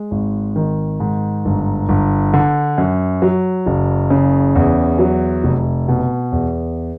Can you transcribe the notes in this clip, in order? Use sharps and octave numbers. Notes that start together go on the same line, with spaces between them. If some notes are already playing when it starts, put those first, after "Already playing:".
Already playing: G#3
G#1
D#3
G#2
G1
G1
D3
F#2
F#3
F#1
C#3
E2
F#3
F1
B2
E2